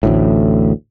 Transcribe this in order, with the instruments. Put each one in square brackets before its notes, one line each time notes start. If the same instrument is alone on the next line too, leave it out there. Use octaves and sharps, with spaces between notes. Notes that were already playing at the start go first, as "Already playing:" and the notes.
[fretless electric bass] A1 D2 A2